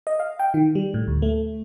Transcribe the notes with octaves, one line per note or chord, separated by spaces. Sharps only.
D#5
F5
G5
D#3
G3
A2
D2
A3